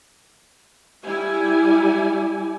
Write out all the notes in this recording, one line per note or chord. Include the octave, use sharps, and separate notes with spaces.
G3 E4 G4 G#5